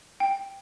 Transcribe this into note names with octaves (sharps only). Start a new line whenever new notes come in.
G5